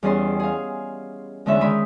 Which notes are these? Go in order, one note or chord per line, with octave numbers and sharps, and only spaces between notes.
E2 G3 C#4 G#4 D#5 C6
G#4 F5
E2 D3 G#3 C#4 E5
D#3 G#3 B5 D#6